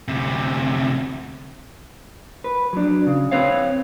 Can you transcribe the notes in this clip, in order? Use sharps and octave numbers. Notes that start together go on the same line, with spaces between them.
D2 C3
B4
F#3 D4
C#3
C4 B4 C#5 F5